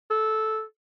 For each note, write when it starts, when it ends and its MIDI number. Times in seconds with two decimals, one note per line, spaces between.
0.11 0.63 69